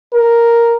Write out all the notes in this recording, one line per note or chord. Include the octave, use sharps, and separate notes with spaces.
A#4